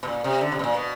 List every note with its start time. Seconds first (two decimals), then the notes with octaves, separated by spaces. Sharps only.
0.03 B2
0.07 A#2
0.24 C3
0.41 D3
0.52 C3
0.59 B2
0.64 A#2
0.75 B2